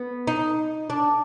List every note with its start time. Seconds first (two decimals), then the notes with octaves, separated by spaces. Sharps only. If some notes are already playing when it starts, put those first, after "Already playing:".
Already playing: B3
0.27 D#4
0.90 D4